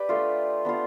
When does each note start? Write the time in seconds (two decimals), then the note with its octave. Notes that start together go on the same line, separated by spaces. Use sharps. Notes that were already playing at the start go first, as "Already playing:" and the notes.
Already playing: G4 B4 D5
0.09 A3 D4 F4
0.65 B3 D4 F4